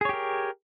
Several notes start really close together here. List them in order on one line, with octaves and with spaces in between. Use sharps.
G#4 C#5 G4 A#4